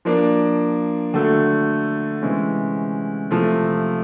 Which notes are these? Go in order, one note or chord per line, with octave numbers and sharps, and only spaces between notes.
F3 A#3 D4
D3 F#3 A3
C3 E3 G#3 C#4
C3 F3 A3